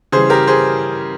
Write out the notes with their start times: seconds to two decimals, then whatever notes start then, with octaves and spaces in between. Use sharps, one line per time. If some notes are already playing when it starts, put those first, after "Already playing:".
0.12 C#3 E3 G3 G#4 C5
0.30 G4 A#4
0.47 G#4 C5